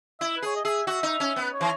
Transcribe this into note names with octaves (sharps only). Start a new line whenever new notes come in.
E4 E5
B4
G#4 C#5
D#5
G#4 E5
F#4 E5
D#4
C#4
B3
B4
C#5
E3